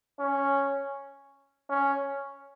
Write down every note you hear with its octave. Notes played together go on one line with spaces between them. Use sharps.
C#4
C#4